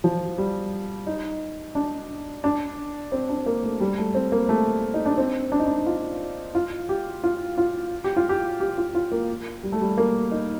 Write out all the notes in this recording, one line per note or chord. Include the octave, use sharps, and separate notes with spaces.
F3
G3
D#4
D4
D4
C4
D4
A#3
A3
G3
A3
C4
A#3
A3
D#4
D4
C4
D4
D#4
D4
F4
F4
G4
F4
F4
G4
F4
G4
G4
F4
F4
A#3
G3
A3
G3
A#3
D#4